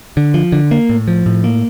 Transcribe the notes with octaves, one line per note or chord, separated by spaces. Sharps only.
D3
F3
D3
A#3
A2
F3
A2
A#3